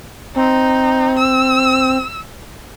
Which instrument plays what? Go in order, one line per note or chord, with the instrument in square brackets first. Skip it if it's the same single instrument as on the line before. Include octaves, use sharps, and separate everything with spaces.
[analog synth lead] C4 [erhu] D#4
[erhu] E6